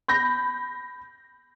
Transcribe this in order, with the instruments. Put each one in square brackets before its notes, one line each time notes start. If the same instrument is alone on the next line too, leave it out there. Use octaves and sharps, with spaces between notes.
[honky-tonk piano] B5 G6 A#6